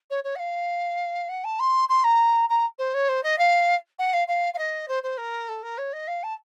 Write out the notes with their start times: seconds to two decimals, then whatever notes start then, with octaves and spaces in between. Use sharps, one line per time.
0.10 C#5
0.24 C#5
0.35 F#5
0.39 F5
1.29 F#5
1.44 A5
1.60 C6
1.89 C6
2.04 A#5
2.49 A#5
2.79 C5
2.94 C#5
3.09 C5
3.23 D#5
3.38 F5
3.99 F#5
4.13 F5
4.28 F5
4.54 F5
4.58 D#5
4.88 C5
5.03 C5
5.18 A#4
5.49 A4
5.63 A#4
5.78 C#5
5.93 D#5
6.08 F5
6.23 A5